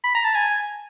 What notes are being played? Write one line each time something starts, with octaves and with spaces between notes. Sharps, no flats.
B5
A#5
A5
G#5